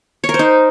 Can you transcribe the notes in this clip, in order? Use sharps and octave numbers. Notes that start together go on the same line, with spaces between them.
C#5
A#4
C5
D#4